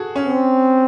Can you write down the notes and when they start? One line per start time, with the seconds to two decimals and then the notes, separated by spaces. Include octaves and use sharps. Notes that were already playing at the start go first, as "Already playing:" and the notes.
Already playing: F#4 G#4 A4
0.16 C#4
0.27 C4